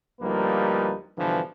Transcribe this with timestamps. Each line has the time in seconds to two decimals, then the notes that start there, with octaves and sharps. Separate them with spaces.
0.22 D2 F3 G3 A#3 D#4 B4
1.18 G2 B2 D3 E3 F3